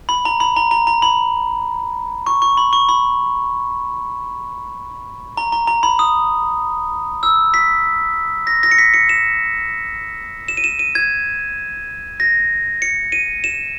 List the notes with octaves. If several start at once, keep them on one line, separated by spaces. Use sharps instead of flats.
B5
A#5
B5
A#5
A#5
A#5
B5
C#6
C#6
B5
C#6
B5
A#5
A#5
A#5
B5
D#6
E6
B6
A#6
A#6
C#7
B6
C#7
E7
E7
D#7
E7
D#7
G#6
A#6
C#7
D#7
E7